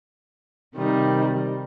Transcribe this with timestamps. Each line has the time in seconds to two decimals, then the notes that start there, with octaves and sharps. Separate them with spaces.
0.76 C3 D#3 G3 D#4